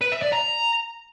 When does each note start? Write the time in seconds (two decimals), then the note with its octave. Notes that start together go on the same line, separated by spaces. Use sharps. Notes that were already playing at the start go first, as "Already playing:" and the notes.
0.01 B4
0.12 E5
0.22 D5
0.32 A#5